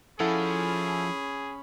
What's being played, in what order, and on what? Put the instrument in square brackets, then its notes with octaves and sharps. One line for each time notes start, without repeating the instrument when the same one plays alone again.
[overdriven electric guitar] F3 [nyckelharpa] C#4 B5 [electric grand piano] E4 A4 F#5 [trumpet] G#4